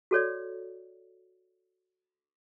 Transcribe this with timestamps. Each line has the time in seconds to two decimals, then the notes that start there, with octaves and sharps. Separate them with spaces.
0.11 F#4 A4 C#5 D5